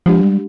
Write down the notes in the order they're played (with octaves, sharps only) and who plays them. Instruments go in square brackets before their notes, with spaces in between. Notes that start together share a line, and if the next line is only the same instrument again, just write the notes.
[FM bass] F3 [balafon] G#3 D4 G4
[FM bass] G3